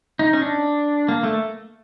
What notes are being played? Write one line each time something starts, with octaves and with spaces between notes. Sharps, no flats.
D#4
C#4
D4
A#3
A3